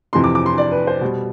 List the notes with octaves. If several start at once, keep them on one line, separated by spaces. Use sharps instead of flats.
F2 C3 E3 C6
D6
D6
C6
D5
B4
C5
B2 G3